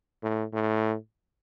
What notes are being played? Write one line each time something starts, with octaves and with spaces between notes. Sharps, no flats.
A2
A2